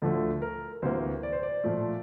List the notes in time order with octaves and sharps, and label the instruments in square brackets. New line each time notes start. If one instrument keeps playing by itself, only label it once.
[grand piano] D2 D3 F3 A3 A4
A#4
D2 C3 E3 A#3 C5
D5
C5
D5
A#2 F3 A3